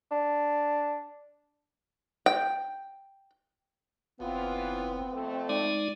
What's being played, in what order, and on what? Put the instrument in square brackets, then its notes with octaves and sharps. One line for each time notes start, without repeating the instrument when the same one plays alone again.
[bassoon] D4
[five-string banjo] G5
[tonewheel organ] F#1 [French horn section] E3 F4 [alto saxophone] B3 [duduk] C4
[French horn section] F2 A3
[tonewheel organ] G#3 D#4 [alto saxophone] D5